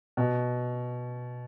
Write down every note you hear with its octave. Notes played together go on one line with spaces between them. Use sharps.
B2